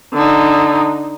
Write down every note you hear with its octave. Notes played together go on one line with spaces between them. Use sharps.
D3 D#4